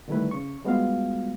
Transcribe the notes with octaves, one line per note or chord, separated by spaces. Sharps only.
D3 D#3 G3 A3 E4 B4
C#3 C#6
G3 G#3 B3 F4 F#4 F5